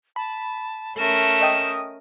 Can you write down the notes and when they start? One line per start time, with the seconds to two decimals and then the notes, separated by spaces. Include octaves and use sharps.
0.16 A5 B5
0.98 A3 C#4 A#4 E7
1.41 D#5 G5 D#6